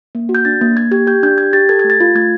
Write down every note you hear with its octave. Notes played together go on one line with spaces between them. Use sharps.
A#3
F#4
G6
D4 A6
A#3
A#3 G#6
G4 G#6
G4 G6
D4 G6
G4 G#6
G4 A6
A4 G#6
G#6
A3
A6
F4
A3 G#6